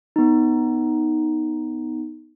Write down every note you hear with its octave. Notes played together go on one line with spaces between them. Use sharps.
B3 D#4